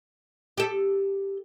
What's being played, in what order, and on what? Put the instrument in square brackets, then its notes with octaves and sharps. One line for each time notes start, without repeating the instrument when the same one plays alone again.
[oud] G4 A4